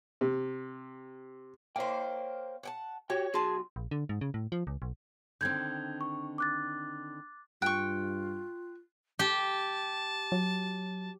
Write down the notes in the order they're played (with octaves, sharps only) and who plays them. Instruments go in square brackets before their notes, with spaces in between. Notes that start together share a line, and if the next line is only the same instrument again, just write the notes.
[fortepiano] C3
[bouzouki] A#3 C5 [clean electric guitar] C#5 F5 G5
[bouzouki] F#5 G5 A5
[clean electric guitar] F#4 G4 G5 [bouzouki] C#5
[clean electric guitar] B1 F#4 C6 [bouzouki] G#4 A5
[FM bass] A#1
D3
G#2
C#3
A2
F3
C#2
B1
[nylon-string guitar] D3 D#3 C4 [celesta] G6 G#6
[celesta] C#6
D6 F#6 A6
[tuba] G2 [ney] F4 [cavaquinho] G5 C#6 [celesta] F#6
[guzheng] G4 [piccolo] A5
[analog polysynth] F#3